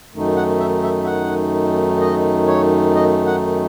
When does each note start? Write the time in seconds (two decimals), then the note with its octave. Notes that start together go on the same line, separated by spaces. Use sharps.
0.13 F#2 D#3 A3 D#4
0.36 F#5
0.60 E5
0.83 E5
1.03 E5
1.06 F#5
2.01 D#5
2.47 C#5
2.95 D#5
3.27 F#5